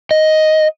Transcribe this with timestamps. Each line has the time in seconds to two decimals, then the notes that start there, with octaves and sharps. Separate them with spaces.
0.11 D#5